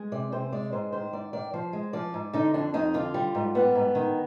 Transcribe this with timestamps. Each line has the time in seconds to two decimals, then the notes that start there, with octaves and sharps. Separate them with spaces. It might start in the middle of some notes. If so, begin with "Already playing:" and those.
Already playing: G#3
0.12 C3 D5
0.32 C3 C5
0.52 G#3 D5
0.73 G#2 C5
0.92 D#3 C5
1.13 G#2 D5
1.33 D#3 D5
1.54 F3 C5
1.73 G#3
1.93 F3 D5
2.14 G#2
2.33 D3 D#4
2.54 F2 D4
2.74 F2 D#4
2.94 D3 F4
3.14 G3
3.35 G#2
3.55 G3 B3
3.75 G#2
3.95 D#3